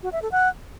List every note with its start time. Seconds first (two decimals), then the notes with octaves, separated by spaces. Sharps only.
0.03 F#4
0.12 E5
0.22 A4
0.32 F#5